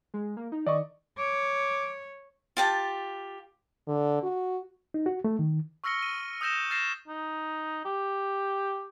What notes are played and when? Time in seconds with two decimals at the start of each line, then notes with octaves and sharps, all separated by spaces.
0.14 G#3
0.37 A#3
0.52 D#4
0.66 D#3 D5 D#5 C#6
1.18 C#5 D6
2.57 F4 G4 A5
3.87 D3
4.23 F#4
4.94 D#4
5.06 F#4
5.24 A3
5.39 D#3
5.84 C#6 E6 F6 A#6 C#7 G7
6.02 D#7
6.41 D#6 E6 G6 A#6 E7 G7
6.70 F6 A6 A#6 C7 E7
7.08 D#4
7.85 G4